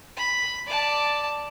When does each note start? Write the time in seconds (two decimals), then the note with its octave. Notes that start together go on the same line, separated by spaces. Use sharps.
0.17 B5
0.67 D5 A5